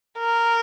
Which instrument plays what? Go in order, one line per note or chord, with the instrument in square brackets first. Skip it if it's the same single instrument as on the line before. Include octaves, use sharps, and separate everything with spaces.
[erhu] A#4